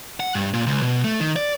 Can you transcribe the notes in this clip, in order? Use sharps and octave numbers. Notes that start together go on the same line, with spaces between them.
F#5
G2
A#2
C#2
B2
A3
D#3
D5